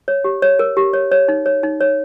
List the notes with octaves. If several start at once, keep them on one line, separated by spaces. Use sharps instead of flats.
C#5
G4
C#5
A#4
G4
C#5
C#5
D#4
C#5
D#4
C#5